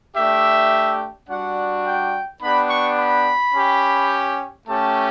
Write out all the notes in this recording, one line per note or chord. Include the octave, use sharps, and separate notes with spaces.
A3 D4 G4 E5
G3 D4 F#4 F#5
G5
B3 D4 G4 B5
C#6
B5
C#4 G4
A3 C#4 G4 A5